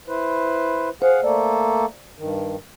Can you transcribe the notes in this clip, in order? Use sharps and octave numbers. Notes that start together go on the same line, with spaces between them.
E4 B4 C5
G#4 C5 F5 F#5
A3 A#3 A4 D5
G2 D#3